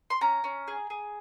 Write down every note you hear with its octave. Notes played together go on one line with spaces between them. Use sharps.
C6
C#4 A#5
C#4
G#4
G#4